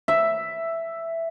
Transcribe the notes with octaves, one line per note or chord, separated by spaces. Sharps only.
E5